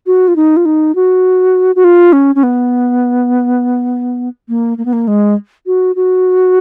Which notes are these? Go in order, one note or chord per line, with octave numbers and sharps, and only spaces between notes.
F#4
F4
D#4
F4
D#4
F#4
F#4
F4
C#4
C#4
B3
A#3
A#3
B3
A#3
G#3
F#4
F#4